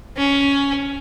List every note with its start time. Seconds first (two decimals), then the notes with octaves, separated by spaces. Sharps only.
0.17 C#4